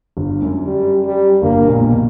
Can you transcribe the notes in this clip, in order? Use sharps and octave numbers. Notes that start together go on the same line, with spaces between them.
G1 G2
F#2
G3
G3
G1 G2 A#3
B2
A#1 A#2
B2
A#2